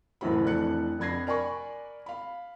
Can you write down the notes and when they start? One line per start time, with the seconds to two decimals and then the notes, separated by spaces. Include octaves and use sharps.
0.21 F#1 A2 E3 F#3 B5
0.43 F1 E3 A3 D4 F#6 C#7
0.99 F1 D4 B5 G#6 A#6 C7
1.27 A#4 D5 G#5 B5 C#6
2.06 F5 B5